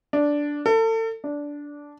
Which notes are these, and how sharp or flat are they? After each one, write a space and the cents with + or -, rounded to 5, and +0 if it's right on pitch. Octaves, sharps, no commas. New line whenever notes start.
D4 -5
A4 +35
D4 -10